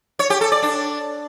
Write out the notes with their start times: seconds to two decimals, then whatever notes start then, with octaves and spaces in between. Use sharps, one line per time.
0.19 C#5
0.30 G4
0.41 A4
0.52 D5
0.62 D4